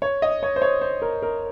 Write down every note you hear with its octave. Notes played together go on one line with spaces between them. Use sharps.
C#5
D#5
C#5
C5
C#5
C5
A#4
A#4